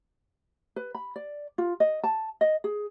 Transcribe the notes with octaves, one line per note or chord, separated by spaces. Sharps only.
B4
B5
D5
F4
D#5
A5
D#5
G#4